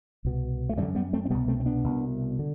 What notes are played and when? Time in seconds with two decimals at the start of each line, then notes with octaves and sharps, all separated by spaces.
0.25 C2 B2
0.69 A3
0.77 F#2 E3 G3
0.82 D3
0.95 G3 B3
1.13 A3 C4
1.25 C4
1.30 C2 B2 G3 B3
1.48 A3 C4
1.60 C4
1.66 B3 D4
1.84 C2 B2
2.39 D3